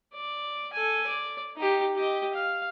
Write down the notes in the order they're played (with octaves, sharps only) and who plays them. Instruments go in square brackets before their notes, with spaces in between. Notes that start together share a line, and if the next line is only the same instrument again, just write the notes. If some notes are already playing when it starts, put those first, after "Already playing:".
[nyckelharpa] D5
A4 G#5
D5
D#4 G4
G4 D#5
F5